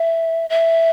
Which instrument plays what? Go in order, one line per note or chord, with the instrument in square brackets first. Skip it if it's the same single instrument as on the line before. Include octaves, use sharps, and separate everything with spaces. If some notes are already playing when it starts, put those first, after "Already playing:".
Already playing: [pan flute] E5
E5